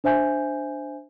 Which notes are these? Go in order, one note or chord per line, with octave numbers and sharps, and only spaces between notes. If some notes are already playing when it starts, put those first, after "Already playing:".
D4 C5 E5 G#5 G6